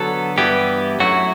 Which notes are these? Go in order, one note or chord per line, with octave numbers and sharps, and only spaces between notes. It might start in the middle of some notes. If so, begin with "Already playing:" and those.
Already playing: D3 F#3 B3 A4
G2 E3 B3 E4 G4
F#2 F#3 A3 E4 F#4